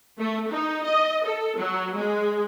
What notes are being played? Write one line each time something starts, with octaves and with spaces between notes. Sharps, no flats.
A3
D#4
D#5
A4
F#3
G#3